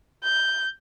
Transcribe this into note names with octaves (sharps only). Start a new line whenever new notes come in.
G6